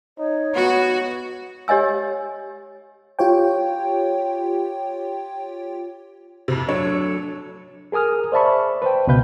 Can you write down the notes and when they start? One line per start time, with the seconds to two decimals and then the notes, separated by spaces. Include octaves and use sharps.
0.18 D#4 C#5
0.55 B3 F#4
1.68 G4 C#5 D#5 G#5 E6
3.19 F4 G4 C#5 G5
6.48 F2 C3
6.69 F#3 D4 A4 C#5
7.92 G#4 A#4 G#5 D#6 F6
8.32 C5 D5 E5 A5 B5 C#6
8.82 B4 C5 G5
9.07 C#2 B2 B3 B4 F5 G6